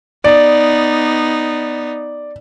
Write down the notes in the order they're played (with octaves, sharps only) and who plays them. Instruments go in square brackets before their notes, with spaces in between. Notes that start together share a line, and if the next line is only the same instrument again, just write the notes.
[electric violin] B3 D#4 [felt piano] D5